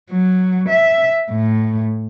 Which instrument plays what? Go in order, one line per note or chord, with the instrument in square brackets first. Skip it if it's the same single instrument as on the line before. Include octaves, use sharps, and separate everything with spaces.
[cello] F#3
E5
A2